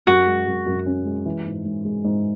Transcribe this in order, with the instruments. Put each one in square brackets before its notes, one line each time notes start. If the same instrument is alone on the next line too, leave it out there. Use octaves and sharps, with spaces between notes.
[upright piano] F#2 [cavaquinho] F#4
[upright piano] G#3
F#2
F#2
C#4
G#3
E3
G#2
G#2
G#3
G#2